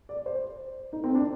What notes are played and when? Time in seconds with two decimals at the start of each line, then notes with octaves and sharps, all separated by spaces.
0.09 D5
0.26 C5
0.93 D#4
1.04 C4
1.15 D4